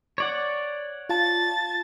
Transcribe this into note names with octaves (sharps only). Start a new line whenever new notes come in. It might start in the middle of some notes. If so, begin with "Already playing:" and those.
C#5 D5 F#5
F4 A5 A6